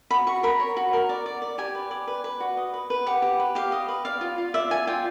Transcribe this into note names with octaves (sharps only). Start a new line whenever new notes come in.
F#4 B5
F#4 C#6
A#4 B5
C#5
F#4
A#4
D5
D5
D5
G4 G#5
B4
D5
B4
B4
F#4
D#5
B4
B4
G4 F#5
G4
B4
G4 F5
D#5
B4
D5 F5
F4
F4
D5 E5
F4 G#5
F4 G5